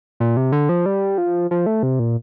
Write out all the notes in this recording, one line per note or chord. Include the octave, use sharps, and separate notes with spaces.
A#2
C3
D3
F3
G3
F3
F3
A3
C3
A#2